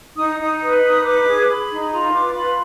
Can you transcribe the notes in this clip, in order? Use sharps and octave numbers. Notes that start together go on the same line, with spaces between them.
D#4 D#6
D#4 D#6
B4 D#6
D#4 D#6
B4 D6
G#4
G#4 B5
D#4
F4 A#5
B4 D6
F4 B5